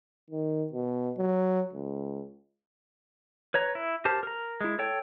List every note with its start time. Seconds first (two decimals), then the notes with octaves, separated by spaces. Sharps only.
0.31 D#3
0.73 B2
1.18 F#3
1.73 C#2
3.54 B4 C#5 A#5
3.75 E4
4.05 G4 A#4 C5 A5
4.23 A#4 A#5
4.61 G#3 E4
4.79 A4 C#5 G5